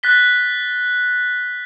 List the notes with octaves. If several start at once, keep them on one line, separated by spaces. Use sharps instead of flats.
F#6 A6 B6 G7